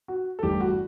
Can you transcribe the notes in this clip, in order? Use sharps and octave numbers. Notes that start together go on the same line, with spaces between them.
F#4
A4
G1 G2 E3 A3 G4
F#4